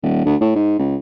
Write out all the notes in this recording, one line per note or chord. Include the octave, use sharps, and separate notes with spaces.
D#1
D2
A2
G#2
C#2